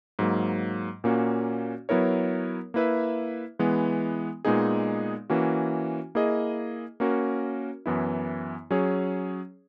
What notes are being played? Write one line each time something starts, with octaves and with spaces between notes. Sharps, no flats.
G#2 F#3 A#3
A#2 A#3 C#4 F#4
F#3 B3 E4 A#4 C#5
A#3 E4 B4 E5
E3 G#3 B3
A#2 G#3 B3 D#4 G#4
E3 A#3 C#4 F#4
A#3 E4 G#4 D#5
A#3 C#4 F#4 A#4
F#2 E3 B3 E4
F#3 C#4 G#4 C#5